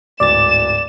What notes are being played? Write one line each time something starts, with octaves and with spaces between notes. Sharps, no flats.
D1 G#2 D5 A6 E7